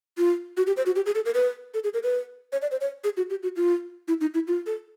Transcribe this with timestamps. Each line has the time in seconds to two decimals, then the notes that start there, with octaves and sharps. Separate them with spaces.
0.18 F4
0.57 F#4
0.67 G4
0.77 C5
0.86 F#4
0.96 G4
1.06 G#4
1.15 A4
1.25 A#4
1.34 B4
1.74 A4
1.84 G#4
1.94 A#4
2.03 B4
2.52 C#5
2.62 D5
2.71 C5
2.81 C#5
3.04 G#4
3.17 F#4
3.30 G4
3.43 F#4
3.56 F4
4.08 E4
4.21 D#4
4.34 E4
4.48 F4
4.66 A4